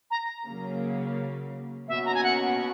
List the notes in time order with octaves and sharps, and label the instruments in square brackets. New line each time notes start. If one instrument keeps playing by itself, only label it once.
[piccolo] A#5
[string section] C#3 F#3 A#3
[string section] B2 A#3 C#4 F#4 [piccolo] E5
[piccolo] A#5
G#5
F#5